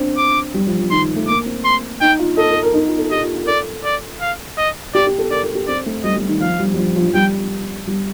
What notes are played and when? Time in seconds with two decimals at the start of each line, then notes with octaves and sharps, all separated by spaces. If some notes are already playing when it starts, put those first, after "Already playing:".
Already playing: C4 D4
0.17 D6
0.54 G3
0.67 F3
0.80 F3
0.91 D#3 C6
1.16 A3
1.28 A#3 D6
1.46 C4
1.65 C6
2.01 D#4 G5
2.19 F4
2.37 A4 D#5
2.51 A4
2.63 A#4
2.74 D#4
2.87 F4
2.98 A4
3.11 G4 D#5
3.23 F4
3.36 F4
3.43 A#4
3.47 A4 D5
3.85 D5
4.21 F5
4.58 D#5
4.95 G4 D5
5.07 G4
5.18 A4
5.31 A#4 D5
5.43 A4
5.55 G4
5.68 C4 D5
5.86 A3
6.04 G3 D#5
6.16 G3
6.29 D#3
6.41 F3 F5
6.59 G3
6.74 G3
6.77 F3
6.96 F3
7.08 F3
7.14 G3 G5
7.87 G3